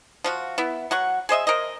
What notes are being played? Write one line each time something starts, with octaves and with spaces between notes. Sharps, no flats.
F3 F4 F#4
B3 E4
F#3 F#5 C#6
G#4 C5 D#5 E5
A#4 C5 D#5